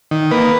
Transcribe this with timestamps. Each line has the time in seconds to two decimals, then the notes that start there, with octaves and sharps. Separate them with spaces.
0.11 D#3
0.31 A#3 B4